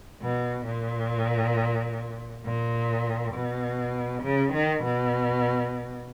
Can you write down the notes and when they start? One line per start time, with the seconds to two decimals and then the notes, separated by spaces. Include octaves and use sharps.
0.22 B2
0.66 A#2
2.45 A#2
3.34 B2
4.23 C#3
4.53 D#3
4.84 B2